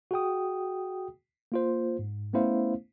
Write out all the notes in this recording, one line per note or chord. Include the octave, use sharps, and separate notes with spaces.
F#4 G#4 G5 D#6
A#3 F4 C5
G#2
A3 B3 C#4 E4 C5 F5